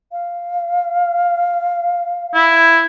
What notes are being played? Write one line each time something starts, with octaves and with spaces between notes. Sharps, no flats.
F5
E4